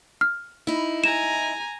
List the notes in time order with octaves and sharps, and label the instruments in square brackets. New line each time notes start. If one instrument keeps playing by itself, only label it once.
[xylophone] F6
[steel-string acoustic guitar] D#4 E4
[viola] G#5 A#5 [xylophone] E7